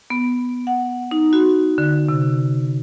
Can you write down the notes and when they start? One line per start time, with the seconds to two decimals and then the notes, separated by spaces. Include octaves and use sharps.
0.10 B3
0.67 F#5
1.11 D#4
1.33 F#4
1.78 D3
2.09 C3